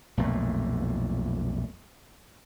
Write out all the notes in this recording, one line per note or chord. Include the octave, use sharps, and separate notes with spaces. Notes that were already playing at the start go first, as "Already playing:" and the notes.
B1 F2 A#2 A3